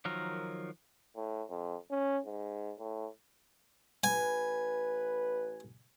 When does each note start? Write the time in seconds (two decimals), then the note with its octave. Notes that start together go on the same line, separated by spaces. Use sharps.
0.05 D#3 F3 F#3 A#4
1.16 A2
1.49 F2
1.91 C#4
2.26 G#2
2.79 A2
4.04 A1 B4 G#5